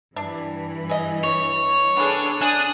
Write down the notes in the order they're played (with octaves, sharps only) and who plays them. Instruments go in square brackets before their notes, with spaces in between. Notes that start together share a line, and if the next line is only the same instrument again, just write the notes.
[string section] G2 E3 [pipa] D4
[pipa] G#4 D#5
[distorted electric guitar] C#5
[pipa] B3 C#4 [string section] D4 G#4 A4
[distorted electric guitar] D4 [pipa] G#5 [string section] D#6 F#6